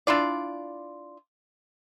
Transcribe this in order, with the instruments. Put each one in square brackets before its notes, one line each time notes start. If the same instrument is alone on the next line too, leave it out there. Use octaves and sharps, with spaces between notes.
[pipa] D4 E4 F4 D5